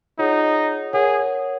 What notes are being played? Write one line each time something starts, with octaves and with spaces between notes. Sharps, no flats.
D#4 F4 G#4 C#5 F#5
G#4 A#4 C#5 F#5